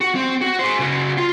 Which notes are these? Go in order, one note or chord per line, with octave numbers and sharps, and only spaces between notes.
F#4
C4
F#4
G#4 C5
C#3 F#4
F4